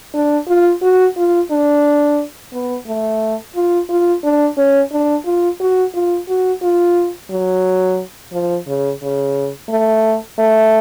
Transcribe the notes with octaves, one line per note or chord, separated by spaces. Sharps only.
D4
F4
F#4
F4
D4
B3
A3
F4
F4
D4
C#4
D4
F4
F#4
F4
F#4
F4
F#3
F3
C#3
C#3
A3
A3